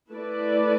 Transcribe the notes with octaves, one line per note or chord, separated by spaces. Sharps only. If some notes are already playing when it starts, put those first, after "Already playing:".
A3 E4 B4 D5